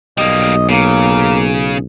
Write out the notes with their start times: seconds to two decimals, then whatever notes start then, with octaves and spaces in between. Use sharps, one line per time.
0.18 B1 G3 A#3 D#5
0.69 C#3 A#3